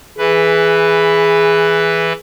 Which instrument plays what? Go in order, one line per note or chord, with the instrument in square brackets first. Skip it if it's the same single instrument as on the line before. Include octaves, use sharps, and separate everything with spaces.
[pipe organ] E3 B4 [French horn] G#4